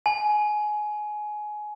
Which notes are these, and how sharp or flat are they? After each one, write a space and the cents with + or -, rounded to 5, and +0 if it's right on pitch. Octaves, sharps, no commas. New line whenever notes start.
G#5 +20